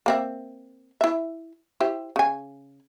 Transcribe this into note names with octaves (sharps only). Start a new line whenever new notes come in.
A#3 C4 E5
E4 E5
E4 G4 C5
C#3 G#5